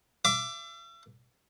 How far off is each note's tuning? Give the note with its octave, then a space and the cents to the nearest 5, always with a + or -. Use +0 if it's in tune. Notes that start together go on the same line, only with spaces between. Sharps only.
E5 +40 D6 +0